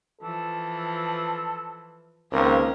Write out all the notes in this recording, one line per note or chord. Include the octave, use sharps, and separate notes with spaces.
E3 F3 A4
C#2 D#3 A#3 C4 C#4 A#4